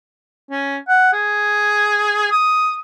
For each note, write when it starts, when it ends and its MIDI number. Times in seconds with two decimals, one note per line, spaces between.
0.50 0.77 61
0.88 1.10 78
1.13 2.27 68
2.31 2.80 87